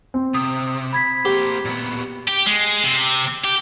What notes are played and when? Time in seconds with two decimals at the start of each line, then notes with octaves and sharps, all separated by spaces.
0.14 C4
0.34 C3 D#6
0.93 B5 G#6 B6
1.25 A#3 G4 C5
1.65 A#2 B3
2.28 G4
2.46 G#3
2.84 C3
3.44 G4